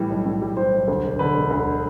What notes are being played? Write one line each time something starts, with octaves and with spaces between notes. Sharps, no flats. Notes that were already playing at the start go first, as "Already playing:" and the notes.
Already playing: A2 E3 G3
B1
A2
G3
E3 C5
B1
D2
E1
D3 B4
E1
D2